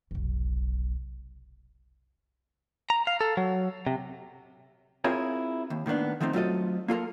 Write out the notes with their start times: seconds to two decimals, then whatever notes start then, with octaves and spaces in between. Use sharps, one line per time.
0.11 F1 B1
2.90 A#5
3.07 F5
3.21 A4
3.37 F#3
3.87 C3
5.04 C4 E4 F4 G#4 A#4 C#5
5.70 D#2
5.86 A2 D#3 A#3 B3 D4
6.20 D#3 F3 A3 C4 D#4
6.33 F#3 A3 C4 F4 A4 D#5
6.88 A#3 F4 A4 A#4